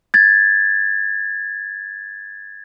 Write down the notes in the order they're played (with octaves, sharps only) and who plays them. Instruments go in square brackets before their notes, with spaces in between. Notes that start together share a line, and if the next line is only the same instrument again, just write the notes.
[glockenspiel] G#6 A6